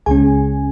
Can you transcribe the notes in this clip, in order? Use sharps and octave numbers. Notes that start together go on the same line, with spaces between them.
C#2 C#3 G#3 C#4 G#4 G#5